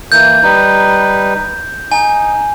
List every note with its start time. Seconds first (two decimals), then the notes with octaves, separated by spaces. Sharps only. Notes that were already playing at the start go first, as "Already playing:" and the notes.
0.12 E3 A#3 G6
0.43 G3 D#4 B4
1.92 D#4 G#5